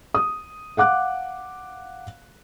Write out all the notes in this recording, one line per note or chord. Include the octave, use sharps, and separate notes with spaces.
D#6
F5 F#5 D6 F#6